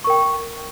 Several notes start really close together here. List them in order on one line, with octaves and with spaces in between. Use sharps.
C#6 A#4 G5